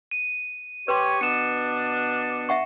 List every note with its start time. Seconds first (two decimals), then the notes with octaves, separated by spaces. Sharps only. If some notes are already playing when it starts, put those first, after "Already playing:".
0.11 D#7
0.88 G4 B4 C#5 C6
1.21 B2 B3 D4 C#7 E7
2.49 E5 F#5 C#6